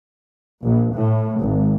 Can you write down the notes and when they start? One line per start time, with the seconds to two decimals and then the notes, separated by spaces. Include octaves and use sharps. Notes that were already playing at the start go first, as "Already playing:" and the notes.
0.64 A#1
0.95 A2
1.42 G#1